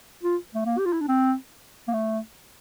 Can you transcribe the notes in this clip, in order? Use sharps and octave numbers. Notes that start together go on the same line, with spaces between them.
F4
A3
A#3
G4
F4
E4
D4
C4
A#3
A3